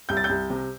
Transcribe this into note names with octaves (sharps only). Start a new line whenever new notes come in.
C2 G6
A6
G6
C2
C3